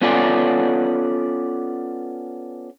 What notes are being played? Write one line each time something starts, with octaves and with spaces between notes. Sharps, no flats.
B3 C#4 F4 A4 D5 G#5